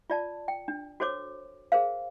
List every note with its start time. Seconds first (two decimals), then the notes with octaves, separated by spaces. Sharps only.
0.10 F4 D5 A5
0.48 G5
0.68 D4
1.00 F#4 A4 C5 C#5 D6
1.72 G#4 A#4 C5 F5